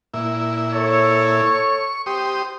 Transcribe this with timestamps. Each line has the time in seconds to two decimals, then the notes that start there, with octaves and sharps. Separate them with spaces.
0.14 A#2 E4
0.72 A4 C#5
1.45 C#6
2.06 G4 C5 D#6